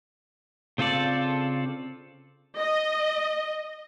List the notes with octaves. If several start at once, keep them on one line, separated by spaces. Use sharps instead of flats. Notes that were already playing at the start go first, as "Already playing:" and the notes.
C#3 C4 F4 A4 D5
D#5